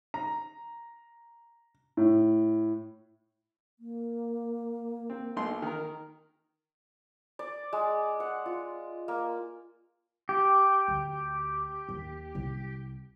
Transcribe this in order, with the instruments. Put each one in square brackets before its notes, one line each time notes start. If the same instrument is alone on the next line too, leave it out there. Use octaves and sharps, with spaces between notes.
[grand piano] A#5
A2
[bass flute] A#3
[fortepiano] C4
B1 D#4 C6
D#3 A#4
[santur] D5
G#3
F#5
F4
A#3
[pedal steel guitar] G4
[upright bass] D2
D#2
C2